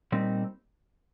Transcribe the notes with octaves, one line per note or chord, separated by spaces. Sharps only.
A#2 G3 C4 D#4